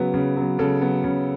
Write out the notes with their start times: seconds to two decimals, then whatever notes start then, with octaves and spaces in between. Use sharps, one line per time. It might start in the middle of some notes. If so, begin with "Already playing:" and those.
Already playing: C#3 F#3 B3 B4
0.14 C#3
0.36 F#3 B3
0.59 C#3 A4
0.82 F#3 B3
1.04 C#3